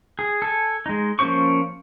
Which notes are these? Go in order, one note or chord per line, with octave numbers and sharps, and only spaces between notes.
G#4
A4 G#5
G#3 D#4
F3 A#3 C#4 C5 C#6